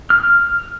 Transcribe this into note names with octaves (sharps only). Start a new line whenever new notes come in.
F6